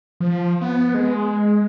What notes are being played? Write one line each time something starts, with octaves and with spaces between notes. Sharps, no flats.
F3
B3
G#3